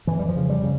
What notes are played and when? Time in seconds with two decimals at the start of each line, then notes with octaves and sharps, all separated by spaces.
0.07 F2 E3
0.19 G3
0.28 F3
0.36 C#3
0.50 G3
0.64 C#3